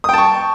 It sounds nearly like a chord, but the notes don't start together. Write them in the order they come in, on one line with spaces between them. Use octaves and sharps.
D#6 G5 A5 C#6